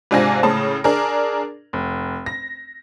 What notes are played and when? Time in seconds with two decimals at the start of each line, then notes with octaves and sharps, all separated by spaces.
0.11 G#2 C3 D4 F4 G#5 A#6
0.43 A2 C#3 A5
0.84 D4 G#4 A#4
1.73 F1
2.26 A#6